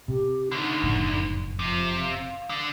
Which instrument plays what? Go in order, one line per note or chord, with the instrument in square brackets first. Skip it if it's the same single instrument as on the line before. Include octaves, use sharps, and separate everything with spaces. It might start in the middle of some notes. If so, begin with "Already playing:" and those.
[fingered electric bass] C3 [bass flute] G4
[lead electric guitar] D2 D3 [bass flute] D#4
[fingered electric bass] F#1 F2 A2
[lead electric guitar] C3 [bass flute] F3
[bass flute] F5
[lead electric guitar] D3